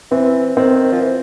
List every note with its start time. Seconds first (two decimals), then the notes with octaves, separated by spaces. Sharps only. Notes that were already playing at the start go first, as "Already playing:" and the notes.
0.11 E3 C4
0.56 D#3 C4
0.92 F3
1.01 E3